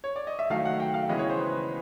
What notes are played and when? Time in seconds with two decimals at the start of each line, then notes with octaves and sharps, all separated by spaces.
0.04 C#5
0.16 D5
0.27 D#5
0.39 E5
0.50 D#3 F#3 A3 F5
0.65 F#5
0.80 G5
0.94 F5
1.09 C#3 E3 G#3 B3 D#5
1.19 C#5
1.30 C5
1.39 B4